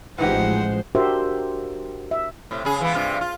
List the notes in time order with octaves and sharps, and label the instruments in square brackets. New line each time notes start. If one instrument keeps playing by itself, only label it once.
[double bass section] A1 F3 [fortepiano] E3 D#4 G4 [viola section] G#3 C5 [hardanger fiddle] F#5
[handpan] D4 F#4 G4 A#4 C5 E5
E5
[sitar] A2 C3
C#3 G#4
E3 G#3 B3
G2 C3 F4
F4